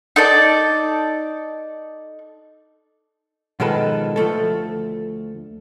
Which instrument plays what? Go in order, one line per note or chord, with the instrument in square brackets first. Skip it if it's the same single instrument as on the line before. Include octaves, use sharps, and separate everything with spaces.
[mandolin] D#4 A4 D5
[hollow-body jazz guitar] B2 D#3 F3 G#3 A4 B4
D2 F3 A3 A4